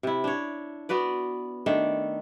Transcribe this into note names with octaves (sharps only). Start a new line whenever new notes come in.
C3 E4
D4 C#5
B3 F#4 B4 D5
D#3 A3 D4